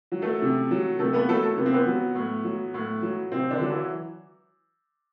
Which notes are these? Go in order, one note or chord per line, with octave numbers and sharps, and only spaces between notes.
F#3
A3 A4
C3
F#3
C3 A3 A4
B3 B4
F#3 A3 A4
C3 B3
C4
B3
F#3
A2
F#3
A2
F#3
C3 C4
D3 D4
F#3
E3 E4